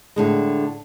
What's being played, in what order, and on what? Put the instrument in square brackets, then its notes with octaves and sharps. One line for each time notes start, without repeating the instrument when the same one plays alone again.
[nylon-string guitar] A2 D3 G#3